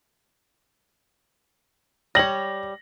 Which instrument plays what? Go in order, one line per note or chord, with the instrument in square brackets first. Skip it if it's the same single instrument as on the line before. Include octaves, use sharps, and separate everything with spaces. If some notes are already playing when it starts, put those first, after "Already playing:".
[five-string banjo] G3 C#5 [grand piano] A#6 F#7